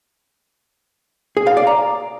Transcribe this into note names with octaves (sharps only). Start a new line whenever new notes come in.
G#4
F5
D5
A#5